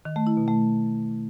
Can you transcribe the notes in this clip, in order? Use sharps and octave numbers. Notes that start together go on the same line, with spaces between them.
D#3
A3
E4
B2
A3